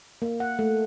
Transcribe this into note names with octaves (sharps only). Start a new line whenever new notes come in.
A#3
F#5
A3